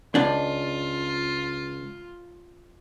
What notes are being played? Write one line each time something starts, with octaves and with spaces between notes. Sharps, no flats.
C#2 D4 F4